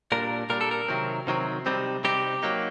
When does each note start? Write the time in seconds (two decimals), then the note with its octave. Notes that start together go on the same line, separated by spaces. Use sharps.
0.12 A#2 G3 D4 A#4
0.50 A#2 G3 D4 A#4
0.61 A4
0.71 A#4
0.88 C3 D#3 F#3 C4
1.27 C3 D#3 F#3 C4
1.66 C3 G3 C4 D#4
2.04 C3 G3 C4 D#4 G4
2.43 F#3 A#3 D#4